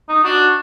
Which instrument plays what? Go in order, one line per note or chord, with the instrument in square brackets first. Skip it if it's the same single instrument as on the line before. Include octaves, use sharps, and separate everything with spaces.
[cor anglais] D#4
[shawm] D4 [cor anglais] F#4